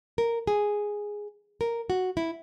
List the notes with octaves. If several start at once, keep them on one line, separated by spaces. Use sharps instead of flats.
A#4
G#4
A#4
F#4
E4